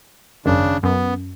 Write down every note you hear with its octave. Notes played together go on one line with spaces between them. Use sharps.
G#1 F#2 C#3 D4
F#2 B3